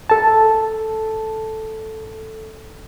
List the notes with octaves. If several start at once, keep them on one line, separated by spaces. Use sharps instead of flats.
A4 A5